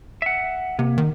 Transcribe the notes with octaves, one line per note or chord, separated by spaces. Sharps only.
E5 F#5
C3 A#3
D#3